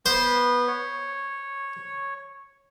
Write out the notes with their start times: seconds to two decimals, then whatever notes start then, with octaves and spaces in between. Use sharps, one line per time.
0.06 B3 B4 C5
0.68 C#5